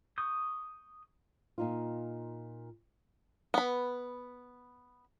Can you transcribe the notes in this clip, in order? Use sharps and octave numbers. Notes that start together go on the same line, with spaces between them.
C#6 D#6 G6
A#2 D#4 F4
B3 B5